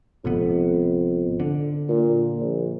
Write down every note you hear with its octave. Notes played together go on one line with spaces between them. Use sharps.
G#1 F2 C3 B3
D3
A#2
A#1